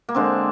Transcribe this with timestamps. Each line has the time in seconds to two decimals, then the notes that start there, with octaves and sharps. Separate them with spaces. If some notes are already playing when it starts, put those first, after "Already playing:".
0.09 A#3
0.15 D3 G#3 C4